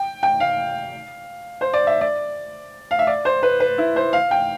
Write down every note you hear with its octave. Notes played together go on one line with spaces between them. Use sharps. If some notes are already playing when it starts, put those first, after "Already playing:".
Already playing: G5
G5
F5
C5
D5
E5
D5
F5
E5
D5
C5
B4
B4
E4
C5
F5
G5